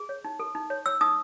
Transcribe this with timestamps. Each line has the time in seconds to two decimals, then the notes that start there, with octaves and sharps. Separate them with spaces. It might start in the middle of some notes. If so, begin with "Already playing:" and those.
Already playing: G#4
0.09 C#5
0.24 D#4
0.40 A4
0.55 D#4
0.70 C#5
0.86 C#5 E6
1.01 D#4 D#6